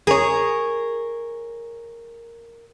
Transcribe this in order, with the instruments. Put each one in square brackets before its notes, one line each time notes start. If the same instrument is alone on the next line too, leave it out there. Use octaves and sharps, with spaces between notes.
[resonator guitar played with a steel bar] G#4 C#5 [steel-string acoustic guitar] A#4